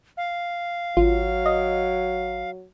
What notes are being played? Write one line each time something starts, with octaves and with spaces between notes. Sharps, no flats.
F5
G#1 F#3 F4
D#5